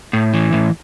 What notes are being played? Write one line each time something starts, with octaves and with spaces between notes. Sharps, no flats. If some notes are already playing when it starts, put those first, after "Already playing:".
A2
E3
A2